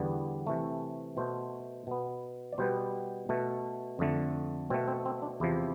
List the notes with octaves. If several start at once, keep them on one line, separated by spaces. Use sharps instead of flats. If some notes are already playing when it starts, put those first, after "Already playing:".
Already playing: E2 D3 G3 B3
C3 E3 A3
B2 A3 C5
B2 B3
D5
B2 G3 B3 C5
B2 A3
F2 D3 A3
B2 A3 C4
C4
C4
D4
E2 C3 F3 E4